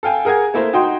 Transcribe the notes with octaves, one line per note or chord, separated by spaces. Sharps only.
A4 F5 G5 G#5
G#4 A#4 F#5 G#5 G#6
A3 A#3 E4 C5
D#4 F#4 G5 C6